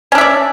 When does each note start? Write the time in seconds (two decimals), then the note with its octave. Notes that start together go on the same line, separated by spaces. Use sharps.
0.12 C#4
0.15 D4
0.18 E5
0.21 D5